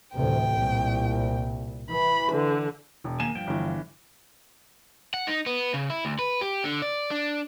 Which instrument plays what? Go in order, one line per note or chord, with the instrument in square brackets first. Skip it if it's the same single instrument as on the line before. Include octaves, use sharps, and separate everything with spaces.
[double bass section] A1 D2 C3 [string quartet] G5
[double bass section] C2 A#2
[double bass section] E3 [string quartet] B5
[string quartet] D3
[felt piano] E1
[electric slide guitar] D#3 A#3 G#5 [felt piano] E7
[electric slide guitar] G2 F3 G5
[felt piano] G1 E3
[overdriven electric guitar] F#5
D#4
B3
C#3
E4
D2
B4
G4
D3
D5
D4